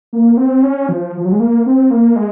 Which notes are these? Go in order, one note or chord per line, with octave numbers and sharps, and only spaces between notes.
A#3
C4
C#4
F3
F3
F#3
G#3
A#3
C4
A#3
G#3